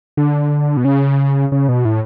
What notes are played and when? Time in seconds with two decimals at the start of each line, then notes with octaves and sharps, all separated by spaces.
0.17 D3
0.77 B2
0.85 C#3
1.52 C#3
1.69 B2
1.85 A2